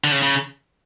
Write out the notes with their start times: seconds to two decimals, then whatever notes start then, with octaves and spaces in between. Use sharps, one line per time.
0.04 D3
0.12 C#3
0.23 C#3